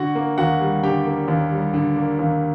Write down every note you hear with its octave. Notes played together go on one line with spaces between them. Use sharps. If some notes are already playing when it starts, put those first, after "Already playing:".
Already playing: D3 F#4 F#5
A#3
D#2 F#4 F#5
G3
D3 G4 G5
A#3
D#2
G3
D3
A#3
D#2